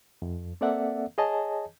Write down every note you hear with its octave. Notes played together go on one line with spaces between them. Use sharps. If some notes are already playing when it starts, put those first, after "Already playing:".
F2
A#3 C4 A4 D5 E5 F#5
G#4 C#5 D#5 G#5 A5